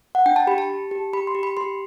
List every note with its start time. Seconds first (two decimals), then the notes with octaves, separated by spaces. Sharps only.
0.15 F#5
0.26 D4 G5
0.36 A5
0.47 G4 B5
0.58 A5
0.70 G4
0.91 G4
1.13 G4 B5
1.27 C6
1.35 G4
1.43 B5
1.57 G4 C6